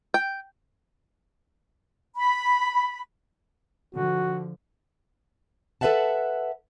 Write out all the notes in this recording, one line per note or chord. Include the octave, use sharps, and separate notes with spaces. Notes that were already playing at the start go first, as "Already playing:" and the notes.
G5
B5
D3 F3 F#4
A4 B4 D#5 E5 F#5 A5